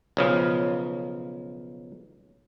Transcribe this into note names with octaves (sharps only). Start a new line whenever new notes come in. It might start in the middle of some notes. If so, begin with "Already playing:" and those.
B1 C#3 F3